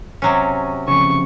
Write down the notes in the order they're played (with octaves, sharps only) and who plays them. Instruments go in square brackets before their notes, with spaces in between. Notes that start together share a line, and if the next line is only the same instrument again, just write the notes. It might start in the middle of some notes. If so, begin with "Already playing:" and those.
[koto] C3 F#3 C#4
[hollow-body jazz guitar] F2 C#3 [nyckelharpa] C#6